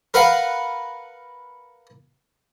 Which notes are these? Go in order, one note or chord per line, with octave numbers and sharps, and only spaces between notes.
A#4 B4 F5 F#5